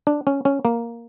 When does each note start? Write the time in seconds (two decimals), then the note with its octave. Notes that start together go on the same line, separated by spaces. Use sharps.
0.07 D4
0.27 C#4
0.45 C#4
0.65 A#3